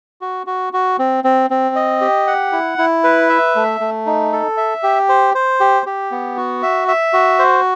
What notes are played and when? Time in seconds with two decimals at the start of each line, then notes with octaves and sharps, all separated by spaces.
0.21 F#4
0.47 F#4
0.73 F#4
0.99 C4
1.24 C4
1.50 C4
1.75 D#5
2.01 G4
2.27 F#5
2.52 E4
2.78 E4
3.04 B4
3.29 E5
3.55 A3
3.80 A3
4.06 D#4
4.32 A4
4.57 E5
4.83 G4
5.09 C5
5.35 C5
5.60 G4
5.86 G4
6.11 B3
6.37 F#4
6.63 E5
6.88 E5
7.13 F#4
7.39 C5